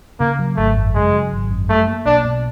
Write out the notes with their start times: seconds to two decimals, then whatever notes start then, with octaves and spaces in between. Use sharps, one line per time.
0.20 C#3 A#3
0.39 F#3
0.57 G#1 A3
0.76 F#2
0.94 C#3 G#3
1.13 F#3
1.31 G#1
1.51 F#2
1.68 G3 A3
1.87 A#3
2.05 B1 D4
2.25 B2